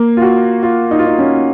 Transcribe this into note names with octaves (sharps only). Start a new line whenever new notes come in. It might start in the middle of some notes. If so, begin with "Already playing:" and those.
Already playing: A#3
F4
F#4
F4
D#4
F4
D#4
C#4